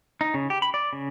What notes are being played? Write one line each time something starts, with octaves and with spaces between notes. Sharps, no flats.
D#4
C#3
G4
B5
D5
C#3